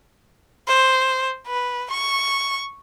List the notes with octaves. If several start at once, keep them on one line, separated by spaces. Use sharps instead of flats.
C5
B4
C#6